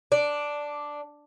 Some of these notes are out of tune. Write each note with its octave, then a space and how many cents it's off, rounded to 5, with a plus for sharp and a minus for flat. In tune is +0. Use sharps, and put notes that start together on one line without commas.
D4 +0 D5 +0